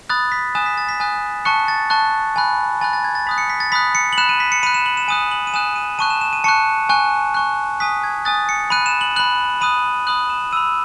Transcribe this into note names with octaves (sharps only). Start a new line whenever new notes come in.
B5 D#6 F#6 A6
B6
G#5 D#6 F#6 E7
B6
A6
B6
G#5 D#6 F#6
A5 C#6 F#6 C#7
A6
A5 C#6 F#6
G#5 B5 F#6
G#5 B5 F#6 A6
A6
G#6
A6
B5 D#6 F#6 B6
C#7
B6
A6
B5 D#6 F#6 B6
C#7
F#7
B5 F#6 E7
D#7
B6
C#7
B5 F#6 D#7
E7
F#7
E7
G#5 D#6 F#6 D#7
F#7
D#7
G#5 D#6 F#6 E7
D#7
A5 C#6 F#6 D#7
E7
E7
D#7
A5 C#6 F#6 C#7
G#5 C#6 F#6
G#5 C#6 F#6
G#5 D#6 F#6 B6
G#6
G#5 D#6 F#6 A6
C#7
B5 F#6 D#7
E7
F#7
B5 F#6 F#7
B5 D#6 F#6 D#7
B5 D#6 F#6 F#7
E7
B5 E6 D#7